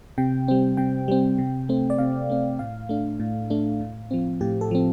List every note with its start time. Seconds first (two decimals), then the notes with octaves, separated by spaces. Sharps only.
0.18 C3 G5
0.48 G3 C4
0.77 C3 G5
1.08 G3 C4
1.38 C3
1.69 A3 C4
1.90 D5
1.98 C3 F5
2.29 A3 C4
2.59 A2 F5
2.89 A3 D4
3.20 A2
3.50 A3 D4
3.81 A2
4.11 F3 C4
4.41 A2 G4
4.61 A4
4.71 F3 C4